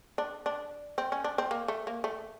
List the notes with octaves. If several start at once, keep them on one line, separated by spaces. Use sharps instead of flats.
D4
D4
C4
C#4
D4
C4
A#3
A3
A#3
A3